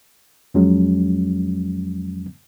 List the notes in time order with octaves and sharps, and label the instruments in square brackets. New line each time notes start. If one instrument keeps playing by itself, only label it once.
[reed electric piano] F2 F3 F#3 G#3 C#4